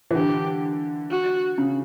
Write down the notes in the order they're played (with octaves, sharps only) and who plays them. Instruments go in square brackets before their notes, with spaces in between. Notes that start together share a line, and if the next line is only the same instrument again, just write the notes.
[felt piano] E3
[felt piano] D3 [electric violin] G4
[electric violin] F#4
[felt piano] C#3